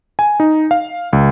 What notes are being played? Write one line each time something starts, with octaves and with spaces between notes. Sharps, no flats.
G#5
D#4
F5
C#2